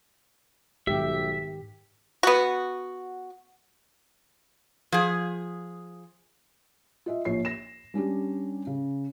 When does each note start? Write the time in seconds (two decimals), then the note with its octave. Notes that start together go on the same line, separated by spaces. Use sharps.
0.87 B1 G#2 D#3 G4 E5
2.23 B3 F#4
4.92 F3 G#4
7.06 F4 D#5 E5
7.25 A#1 F3 C#5 C7
7.45 A#6 E7
7.94 G3 C#4 D4 G4
8.67 C#3